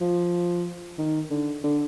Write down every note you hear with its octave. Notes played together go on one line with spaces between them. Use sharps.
F3
D#3
D3
D3